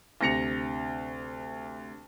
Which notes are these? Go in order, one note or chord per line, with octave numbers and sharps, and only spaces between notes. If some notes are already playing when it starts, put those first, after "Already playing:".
D2 C3 A#6 C#7 F7